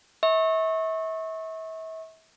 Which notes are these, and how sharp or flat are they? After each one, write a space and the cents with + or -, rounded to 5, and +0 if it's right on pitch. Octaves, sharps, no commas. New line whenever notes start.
E5 -35 C#6 -25